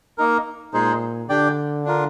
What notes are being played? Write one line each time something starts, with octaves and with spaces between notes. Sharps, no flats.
A#3 D#4 A#4
A#2 G#3 D#4 G#4 C5
D3 D4 G4 D5 G5
D4 F4 A#4